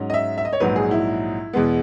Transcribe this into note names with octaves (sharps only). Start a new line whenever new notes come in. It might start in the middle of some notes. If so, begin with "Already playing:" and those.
Already playing: G#2 F#3 C#4
D#5
E5
E5
D#5
C#5
A#1 G#2 F#3 B4
G#4
E4
E2 B2 G#3 B3